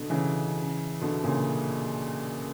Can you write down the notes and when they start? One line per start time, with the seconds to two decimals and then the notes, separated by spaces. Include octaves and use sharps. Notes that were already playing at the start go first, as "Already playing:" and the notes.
Already playing: B2 D3
0.10 C#3 E3
1.01 B2 D3
1.24 A#2 C#3